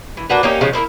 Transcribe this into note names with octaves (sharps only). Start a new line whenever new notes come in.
E3
A#3 D4 F#4 B4
A#3 C#4 D#4 G4
C#3 F3 G#3
A#3 E4 G#4 A#4